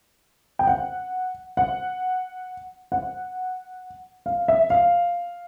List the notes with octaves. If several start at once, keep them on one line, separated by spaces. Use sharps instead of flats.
G5
F#5
F#5
F#5
F5
E5
F5